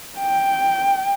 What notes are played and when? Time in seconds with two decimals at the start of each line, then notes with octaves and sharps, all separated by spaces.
0.18 G5